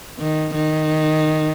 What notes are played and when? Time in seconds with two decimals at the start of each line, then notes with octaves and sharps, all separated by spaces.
0.19 D#3
0.55 D#3